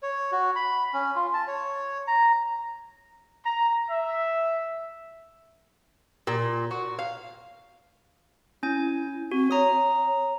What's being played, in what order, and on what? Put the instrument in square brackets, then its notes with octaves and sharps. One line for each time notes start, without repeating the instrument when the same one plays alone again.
[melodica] C#5
F#4
B5
C#4
F4
A5
C#5
A#5
[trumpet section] A#5
E5
[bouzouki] A#2
F#4
F5
[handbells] C#4 G#5 [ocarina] E4
[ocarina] C4 [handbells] F#4
[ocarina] C#5 [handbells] A#5 D#6